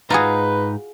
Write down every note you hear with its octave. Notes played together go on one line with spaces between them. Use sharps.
G#2 D#4 F4 F#4 G#4 B4 A#5